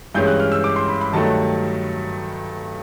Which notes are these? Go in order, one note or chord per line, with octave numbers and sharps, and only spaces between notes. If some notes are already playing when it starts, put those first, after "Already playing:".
G2 E3 G#3 C#4 G6
F#6
F6
E6
D6
C6
B5
B5
G2 D#3 F#3 A3 A5